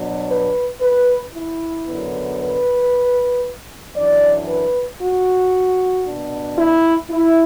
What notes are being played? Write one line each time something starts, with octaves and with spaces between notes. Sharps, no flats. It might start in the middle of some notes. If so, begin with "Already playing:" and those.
Already playing: B2 F#3 D4
B4
B4
E4
F#2 D3 B3
B4
F#2 E3 D4 D5
B4
F#4
B2 B3 D4
E4
E4